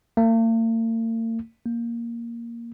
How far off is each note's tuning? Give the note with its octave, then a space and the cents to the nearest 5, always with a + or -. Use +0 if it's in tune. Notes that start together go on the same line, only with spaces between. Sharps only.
A#3 -45
A#3 +5